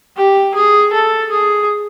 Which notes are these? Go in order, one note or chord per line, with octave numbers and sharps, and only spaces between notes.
G4
G#4
A4
G#4